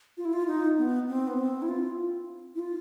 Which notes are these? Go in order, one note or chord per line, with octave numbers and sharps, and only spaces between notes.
F4
E4
F4
D#4
B3
C4
B3
C4
E4
F4
E4
F4